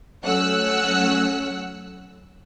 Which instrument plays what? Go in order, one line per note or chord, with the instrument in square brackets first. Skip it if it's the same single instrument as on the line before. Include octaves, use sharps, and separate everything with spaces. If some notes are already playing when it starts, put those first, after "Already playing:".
[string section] F#3 A3 C#4 F#5 E6 F#6